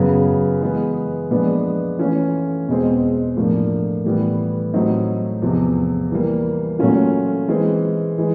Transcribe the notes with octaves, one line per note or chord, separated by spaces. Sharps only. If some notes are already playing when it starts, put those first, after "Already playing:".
Already playing: F#2 C#3 F#3 B3
E3 G#3 B3
A#2 F3 G#3 B3 D4
E3 A3 C#4 F4
E2 B2 G#3 C4
A2 F3 A#3 D4
A2 E3 G3 B3
A2 F#3 A3 C4 D#4
E2 C3 F3
E3 G3 A#3
A#2 F#3 A3 C#4 F4
E3 G#3 C4
E3 G#3